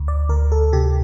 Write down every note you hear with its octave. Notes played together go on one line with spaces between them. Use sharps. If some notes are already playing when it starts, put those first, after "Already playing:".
Already playing: D2
D5
D2 A#4
A4
C3 G4